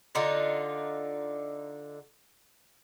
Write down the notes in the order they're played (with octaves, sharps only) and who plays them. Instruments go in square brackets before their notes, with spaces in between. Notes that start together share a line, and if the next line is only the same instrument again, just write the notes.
[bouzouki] D3 D#4 F4